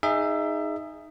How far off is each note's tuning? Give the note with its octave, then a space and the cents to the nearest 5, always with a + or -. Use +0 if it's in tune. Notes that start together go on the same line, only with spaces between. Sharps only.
D#4 +0 G#4 -5 E5 +20